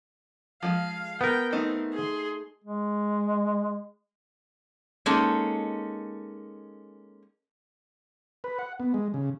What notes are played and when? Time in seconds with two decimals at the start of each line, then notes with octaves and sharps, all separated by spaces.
0.63 F3 G#3 F5
1.21 B3 A#4 G5
1.53 A3 C4 D#4
1.93 G#4 C6
2.64 G#3
5.06 G#3 A#3 C#4 D#4 A4
8.44 B4
8.59 F#5
8.80 B3
8.94 G#3
9.14 C#3